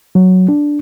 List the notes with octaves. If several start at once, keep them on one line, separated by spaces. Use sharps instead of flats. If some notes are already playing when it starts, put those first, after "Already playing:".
F#3
D4